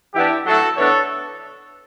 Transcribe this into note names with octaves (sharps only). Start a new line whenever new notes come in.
E3 B3 D4 E4 G4
A2 F#3 A3 E4 F#4 A4
A2 E3 B3 D4 A4 C#5